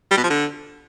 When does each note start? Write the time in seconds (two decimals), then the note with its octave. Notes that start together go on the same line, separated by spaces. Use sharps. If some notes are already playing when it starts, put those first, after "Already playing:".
0.11 G3
0.17 B2
0.24 F3
0.30 D3